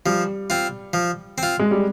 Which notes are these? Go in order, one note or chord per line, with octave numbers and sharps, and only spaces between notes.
F3 G3
C4 F4
F3
C4 F4
G#3
G3